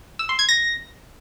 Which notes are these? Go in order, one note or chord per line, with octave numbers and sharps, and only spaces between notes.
E6
C6
G#6
A#6